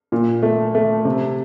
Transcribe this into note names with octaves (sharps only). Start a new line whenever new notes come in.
A#2
A3
A3
C3